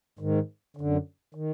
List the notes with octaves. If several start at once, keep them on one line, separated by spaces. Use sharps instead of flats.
G#2 D#3
F#2 D3
D#3